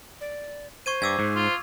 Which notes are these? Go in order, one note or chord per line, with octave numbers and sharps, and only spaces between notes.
D5
C5 C#6 G#6 D#7
G2 D6 E6 G#6
G#2
F4